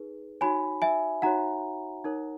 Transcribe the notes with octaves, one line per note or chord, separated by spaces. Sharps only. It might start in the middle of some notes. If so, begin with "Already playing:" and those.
Already playing: D#4 G#4 B4
D#4 F#4 C#5 G#5 B5
E5 G#5
D#4 F#4 C#5 F#5 A#5
D#4 A#4 C#5